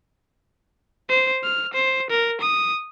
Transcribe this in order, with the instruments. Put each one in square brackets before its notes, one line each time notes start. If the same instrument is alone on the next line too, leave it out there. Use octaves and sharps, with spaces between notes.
[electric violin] C5
F6
C5
A#4
D#6